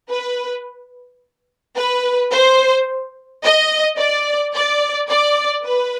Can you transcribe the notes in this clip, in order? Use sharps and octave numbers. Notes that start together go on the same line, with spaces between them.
B4
B4
C5
D#5
D5
D5
D5
B4